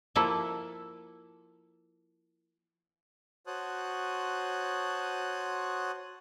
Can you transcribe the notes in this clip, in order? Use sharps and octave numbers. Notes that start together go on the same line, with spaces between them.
F3 A#3 E4 A4
F#4 C5 C#5 A5 D#6 F#6